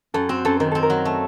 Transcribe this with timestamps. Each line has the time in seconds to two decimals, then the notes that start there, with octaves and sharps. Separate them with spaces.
0.14 F#2 A4
0.29 C4 F#4
0.45 F#2 A4
0.60 D#3 A#4
0.71 C4 A4
0.83 A#4
0.90 F#3
1.05 A3